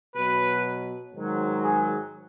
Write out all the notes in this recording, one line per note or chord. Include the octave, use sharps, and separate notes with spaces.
B2 F#3 B4
G#2 D#3 F#3
G#4